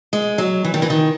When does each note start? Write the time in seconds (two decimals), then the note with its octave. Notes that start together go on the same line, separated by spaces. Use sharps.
0.13 G#3
0.38 F#3
0.64 E3
0.74 D#3
0.82 E3
0.90 D#3